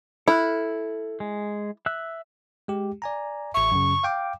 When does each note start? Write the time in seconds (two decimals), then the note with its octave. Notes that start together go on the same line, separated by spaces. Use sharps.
0.28 E4 A4 F6 F#6
1.20 G#3
1.86 E5 E6 F#6
2.68 G#3 G4
3.02 D5 G#5 A#5
3.54 A1 E5 C#6
3.72 F#2 C#3
4.04 F5 G5 D6